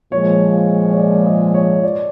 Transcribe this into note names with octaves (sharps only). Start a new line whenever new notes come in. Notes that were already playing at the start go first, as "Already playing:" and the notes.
A#2 F3 G#3 C#5
C#5
D5
D#5
C#5
D5